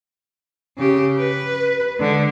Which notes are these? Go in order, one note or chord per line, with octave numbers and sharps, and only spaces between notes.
C#3 G4
B4
D3 G#3